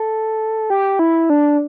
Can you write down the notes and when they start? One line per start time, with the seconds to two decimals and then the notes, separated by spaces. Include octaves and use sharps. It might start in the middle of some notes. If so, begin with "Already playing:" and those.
Already playing: A4
0.70 G4
0.99 E4
1.30 D4